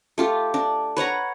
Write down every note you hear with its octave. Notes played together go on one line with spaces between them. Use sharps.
A3 F4 G4
D4
B4 C#5 F#5 A#5